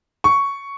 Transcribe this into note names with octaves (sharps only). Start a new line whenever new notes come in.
C#6